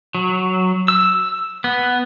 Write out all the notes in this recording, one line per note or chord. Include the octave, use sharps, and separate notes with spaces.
F#3
E6
B3